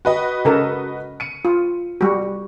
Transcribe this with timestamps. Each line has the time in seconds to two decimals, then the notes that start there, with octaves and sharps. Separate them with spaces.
0.05 F#4 B4 D#5
0.45 C#3 A4 A#4
1.20 C#7 D#7
1.45 F4
2.01 G3 F#4